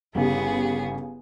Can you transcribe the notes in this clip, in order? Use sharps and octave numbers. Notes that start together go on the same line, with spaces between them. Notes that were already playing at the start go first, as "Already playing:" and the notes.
G1 C#3 B3 E4 G4 G#4